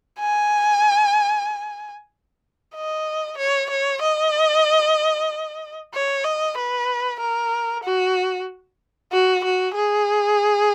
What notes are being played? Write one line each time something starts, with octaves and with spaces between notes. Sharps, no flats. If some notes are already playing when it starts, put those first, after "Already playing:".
G#5
D#5
C#5
C#5
D#5
C#5
D#5
B4
A#4
F#4
F#4
F#4
G#4